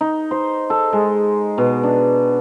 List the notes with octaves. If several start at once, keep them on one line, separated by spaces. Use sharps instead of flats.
D#4
C5
A4
G#3
B2
D4